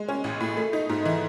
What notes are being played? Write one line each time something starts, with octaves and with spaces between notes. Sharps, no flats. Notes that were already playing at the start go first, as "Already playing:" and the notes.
Already playing: G#3
C#4
A1
A2
A3
D#4
G#2
E3